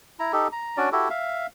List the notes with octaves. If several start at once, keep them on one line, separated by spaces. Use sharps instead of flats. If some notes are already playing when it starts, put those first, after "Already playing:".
E4 A#5
D#4 G4 A4
A#5
C#4 D4 F#4 D5
E4 F#4 G4 A4
E5 F5